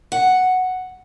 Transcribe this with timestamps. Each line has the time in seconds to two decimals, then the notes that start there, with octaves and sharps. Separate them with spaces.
0.12 F#5